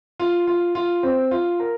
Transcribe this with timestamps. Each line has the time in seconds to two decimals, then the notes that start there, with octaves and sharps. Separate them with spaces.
0.20 F4
0.47 F4
0.75 F4
1.03 C4
1.31 F4
1.60 A#4